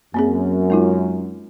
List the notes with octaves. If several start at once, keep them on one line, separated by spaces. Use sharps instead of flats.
F#2 A#3 C4 G#4
G#3 D#4 F4